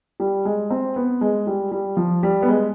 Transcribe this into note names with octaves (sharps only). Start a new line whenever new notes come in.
G3
G#3
C4
B3
G#3
G3
G3
F3
G3
B3
G#3